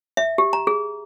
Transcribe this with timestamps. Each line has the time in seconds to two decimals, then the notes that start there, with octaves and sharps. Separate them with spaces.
0.17 E5
0.38 G4
0.53 A#5
0.67 G#4